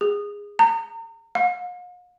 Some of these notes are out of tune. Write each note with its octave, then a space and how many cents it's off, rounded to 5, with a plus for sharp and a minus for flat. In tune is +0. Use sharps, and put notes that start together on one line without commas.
G#4 -20
A#5 -35
F5 +45